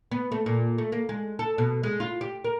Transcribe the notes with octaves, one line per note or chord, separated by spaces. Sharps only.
B3
A3
A#2
A3
A#3
G#3
A4
B2
G#3
F4
G4
A#4